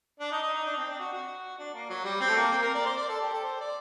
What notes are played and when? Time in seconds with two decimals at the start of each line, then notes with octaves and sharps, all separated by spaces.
0.20 D4
0.32 D#4
0.42 D#4
0.54 D#4
0.66 D4
0.77 C4
0.90 D4
1.00 F#4
1.13 F#4
1.59 D4
1.74 A#3
1.90 F#3
2.05 G3
2.20 C4
2.28 A3
2.37 A#3
2.52 C4
2.62 A#4
2.75 D5
2.86 C5
2.97 D5
3.09 A4
3.20 G4
3.33 A4
3.44 C5
3.60 D5